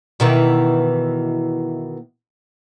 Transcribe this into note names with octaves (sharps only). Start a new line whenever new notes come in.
B2 D#3 E3